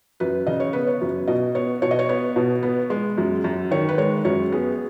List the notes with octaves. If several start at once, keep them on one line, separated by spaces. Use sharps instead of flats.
F#2 B4
C#3 D#5
C#5
B3 B4
C#5
F#2
B2 D#5
B3 C#5
B2 C#5
D#5
C#5
B3 C#5
B2
B3
G#3
F#2
F#2
D#3 C#5
B4
G#3 C#5
F#2 C#5
B3 G#4